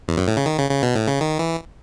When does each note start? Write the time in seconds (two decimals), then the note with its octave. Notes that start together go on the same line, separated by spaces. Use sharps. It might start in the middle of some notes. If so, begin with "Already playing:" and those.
0.08 E2
0.17 F#2
0.27 A2
0.37 C#3
0.46 D#3
0.58 C#3
0.70 C#3
0.83 B2
0.96 A2
1.08 C#3
1.21 D#3
1.39 E3